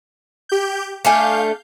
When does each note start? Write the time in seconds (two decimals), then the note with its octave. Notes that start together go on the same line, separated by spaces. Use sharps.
0.49 G4 G6
1.05 A3 D4 F5 G#5 G6